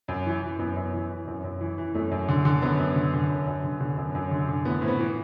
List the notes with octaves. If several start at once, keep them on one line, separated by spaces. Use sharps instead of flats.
F#2
E3
E3
F#2 B3
F#2
E3
E3
F#2
F#2
E3
E3
F#2 A3
F#2
D3
D3
F#2 B3
F#2
D3
D3
F#2
F#2
D3
D3
F#2
F#2
D3
D3
A2 B3
A2 C4
B3
E3